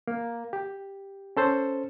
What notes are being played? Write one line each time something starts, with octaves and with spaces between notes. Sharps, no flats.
A#3
G4
C#4 A4 C5